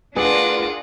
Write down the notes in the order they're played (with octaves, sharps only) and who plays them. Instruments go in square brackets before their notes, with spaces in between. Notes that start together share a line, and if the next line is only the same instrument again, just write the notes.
[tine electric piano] A3 B4 [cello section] D4 F4 A#4 [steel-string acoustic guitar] G#4 [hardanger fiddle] D5 F#5